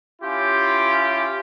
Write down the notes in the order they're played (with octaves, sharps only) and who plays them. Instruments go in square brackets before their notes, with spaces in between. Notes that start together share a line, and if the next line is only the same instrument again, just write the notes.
[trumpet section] C#4 E4 F4 G4